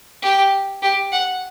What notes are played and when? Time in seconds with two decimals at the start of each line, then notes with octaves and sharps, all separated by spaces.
0.22 G4
0.83 G4
1.12 F#5